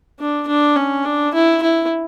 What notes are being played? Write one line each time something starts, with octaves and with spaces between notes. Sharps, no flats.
D4
D4
C#4
D4
E4
E4